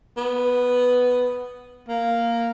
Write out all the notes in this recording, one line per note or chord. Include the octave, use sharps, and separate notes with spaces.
B3
A#3